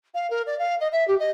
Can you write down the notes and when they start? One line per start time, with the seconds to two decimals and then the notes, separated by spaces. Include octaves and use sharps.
0.14 F5
0.30 A#4
0.46 D5
0.59 F5
0.80 D#5
0.92 E5
1.07 G4
1.19 D#5